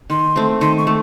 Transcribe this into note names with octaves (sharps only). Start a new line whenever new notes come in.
D#3 C6
A3 C4
D#3 C6
C#6
A3